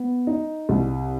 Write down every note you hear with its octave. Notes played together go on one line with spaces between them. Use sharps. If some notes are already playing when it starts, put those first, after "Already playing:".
Already playing: B3
D#4
C2